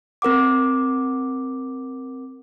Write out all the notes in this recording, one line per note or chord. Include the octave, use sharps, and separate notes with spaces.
C4 A#4 F#5 D6